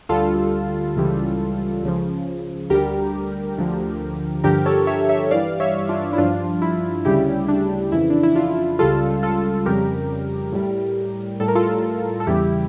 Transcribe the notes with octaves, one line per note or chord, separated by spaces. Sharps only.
D2 D3 G3 F4 A4
C#2 C#3 E3 G3
C#2 C#3 F3
D2 D3 G3 G4 A#4
D2 D3 F3
G2 D3 F3 G4 A#4
A4 C#5
C#5 E5
C#5 E5
G2 E3 G3 D5 F5
C#5 E5
D4 F4
E4
G2 F3 D4 F4
E4
D2 C#3 G3 E4 G4
D4
F2 C#3 E3 E4
D4
E4
D4 F4
C#2 C#3 G3 F4 A4
F4 A4
F2 C#3 G3 G4 A#4
A2 G3
A2 G3 A4
A#4
F4 A4
A4
E2 C#3 E3 G3 E4 G4